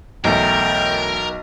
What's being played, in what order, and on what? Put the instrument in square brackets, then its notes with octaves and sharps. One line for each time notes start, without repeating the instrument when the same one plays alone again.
[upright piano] B1 [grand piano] E2 A3 [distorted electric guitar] A#4 [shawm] G5